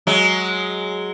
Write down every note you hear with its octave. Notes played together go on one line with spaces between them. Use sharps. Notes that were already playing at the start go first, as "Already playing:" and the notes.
F#3 G#3